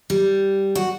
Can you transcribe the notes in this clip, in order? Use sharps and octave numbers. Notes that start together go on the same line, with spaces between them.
G3
F#4